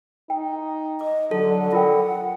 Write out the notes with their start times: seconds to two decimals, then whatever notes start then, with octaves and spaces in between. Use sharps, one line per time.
0.30 D#4 G5
1.01 D#5 D6
1.31 D3 F#3 A4
1.72 F4 A#4 F#5 G5